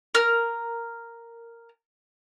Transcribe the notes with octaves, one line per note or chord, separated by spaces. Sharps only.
A#4 F6